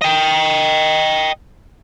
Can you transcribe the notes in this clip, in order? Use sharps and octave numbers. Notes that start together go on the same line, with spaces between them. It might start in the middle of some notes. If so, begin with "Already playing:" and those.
D#5 G5